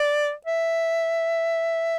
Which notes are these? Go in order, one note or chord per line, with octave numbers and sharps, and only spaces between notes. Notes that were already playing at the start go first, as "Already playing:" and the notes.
Already playing: D5
E5